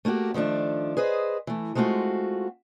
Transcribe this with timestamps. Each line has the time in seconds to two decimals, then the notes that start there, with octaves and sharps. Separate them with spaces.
0.05 A3 A#3 E4 F#4 G4
0.34 D#3 F3 A3 D4
0.97 G#4 B4 C5 D#5
1.47 E3 A3
1.75 G#3 A3 C4 F4 F#4